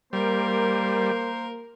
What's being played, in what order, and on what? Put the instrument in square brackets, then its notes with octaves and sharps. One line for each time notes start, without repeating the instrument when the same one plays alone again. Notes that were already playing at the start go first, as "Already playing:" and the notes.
[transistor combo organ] G3 [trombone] A#3 [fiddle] A#4 [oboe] C5